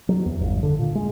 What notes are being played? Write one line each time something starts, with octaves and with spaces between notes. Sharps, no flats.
F#3
E2
G1
D3
A#2
G#3